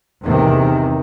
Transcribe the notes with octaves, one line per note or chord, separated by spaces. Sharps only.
E2 C3 D#3